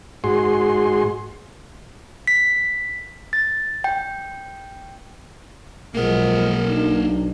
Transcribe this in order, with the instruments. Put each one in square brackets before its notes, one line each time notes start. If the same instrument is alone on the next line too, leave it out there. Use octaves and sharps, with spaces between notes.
[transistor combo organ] G#2 F#4 G#4 C6
[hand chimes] B6
A6
G5
[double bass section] B1 [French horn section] F3 G#3 [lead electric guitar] A#3 F#5 [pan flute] A#4
[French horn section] B2 D4 D#4